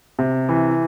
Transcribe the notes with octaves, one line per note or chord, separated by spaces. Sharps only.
C3
E3